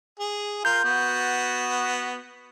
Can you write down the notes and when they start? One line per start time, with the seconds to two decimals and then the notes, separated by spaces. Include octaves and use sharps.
0.19 G#4
0.65 F4 A#4 G6
0.84 B3 F#4